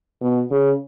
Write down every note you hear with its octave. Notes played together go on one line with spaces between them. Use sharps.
B2
C#3